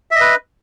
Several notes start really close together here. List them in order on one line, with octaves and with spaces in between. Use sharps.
E5 D#5 B4